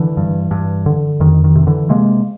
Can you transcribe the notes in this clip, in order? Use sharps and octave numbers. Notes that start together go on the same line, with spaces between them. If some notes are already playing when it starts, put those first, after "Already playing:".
Already playing: D3 E3
G2
G2
D3
F2 D#3
D#3
C3
D3 E3
C3 G#3 A#3